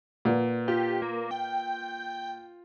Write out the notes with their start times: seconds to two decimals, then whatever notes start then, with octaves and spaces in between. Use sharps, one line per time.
0.25 A#2 B4 D5 F#5
0.68 F4 G4
1.02 A#3
1.31 G5